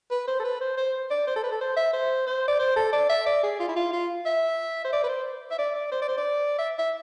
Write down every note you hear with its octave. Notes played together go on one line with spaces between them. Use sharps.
B4
C5
A4
B4
C5
C5
D5
C5
A4
B4
A4
C5
E5
C5
C5
D5
C5
A4
D5
E5
D5
G#4
F4
E4
F4
F4
E5
C5
D5
B4
C5
E5
D5
D5
C5
D5
C5
D5
E5
E5